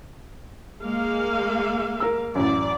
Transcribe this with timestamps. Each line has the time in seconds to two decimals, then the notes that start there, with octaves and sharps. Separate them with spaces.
0.82 G#3 A#3 F5
2.00 A#4 E6
2.35 A1 F#2 D5